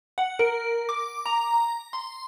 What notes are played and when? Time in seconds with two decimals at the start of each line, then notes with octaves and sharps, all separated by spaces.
0.18 F#5
0.39 A#4
0.89 D6
1.26 A#5
1.93 C6